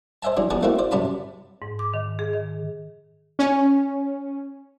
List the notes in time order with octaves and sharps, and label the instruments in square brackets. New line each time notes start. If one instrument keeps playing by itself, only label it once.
[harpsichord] C5 D#5 E5 G#5 A5
E3 F#3 D4
F2 B3 G#4 D5 A5 D#6
A3 A#3 C4 D#4 E4 F#4
C5 D5
F#2 C3 D5 A5 B5 D#6
[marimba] G#2
D6
D#3
G#4
D#3
[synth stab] C#4